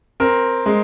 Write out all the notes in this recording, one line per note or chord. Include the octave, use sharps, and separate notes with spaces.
C4 A#4
G#3